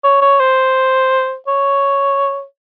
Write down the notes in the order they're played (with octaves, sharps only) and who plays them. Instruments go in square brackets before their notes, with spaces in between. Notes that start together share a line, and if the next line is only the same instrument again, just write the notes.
[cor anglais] C#5
C#5
C5
C#5